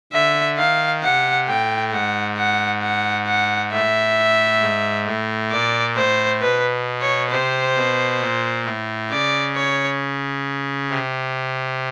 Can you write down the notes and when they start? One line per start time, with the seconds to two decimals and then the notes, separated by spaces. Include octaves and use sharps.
0.13 D3 E5
0.57 D#3 F5
1.03 C3 F#5
1.48 A2 G5
1.92 G#2 F#5
2.38 F#5
2.83 F#5
3.27 F#5
3.72 A2 E5
4.61 G#2
5.06 A2
5.51 A#2 D5
5.96 A2 C5
6.41 B2 B4
7.01 C#5
7.31 C3 C5
7.76 B2
8.21 A#2
8.65 A2
9.10 C#3 D5
9.55 C#5
10.90 C3